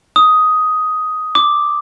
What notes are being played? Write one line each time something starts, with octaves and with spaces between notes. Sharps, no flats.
D#6
D6